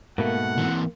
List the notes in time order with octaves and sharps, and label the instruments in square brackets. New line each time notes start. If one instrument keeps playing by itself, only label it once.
[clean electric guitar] G#2 B2 A3 [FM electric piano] A#3 [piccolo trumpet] F#5
[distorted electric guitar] E3 C4